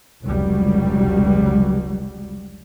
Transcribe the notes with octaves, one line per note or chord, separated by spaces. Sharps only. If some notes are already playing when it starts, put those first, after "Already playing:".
F1 C#2 F#3 G3